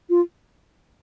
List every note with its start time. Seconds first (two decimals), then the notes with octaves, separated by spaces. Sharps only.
0.10 F4